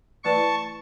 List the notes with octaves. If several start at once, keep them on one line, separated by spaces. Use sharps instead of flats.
E3 A3 E4 B4 D5 A5 C#6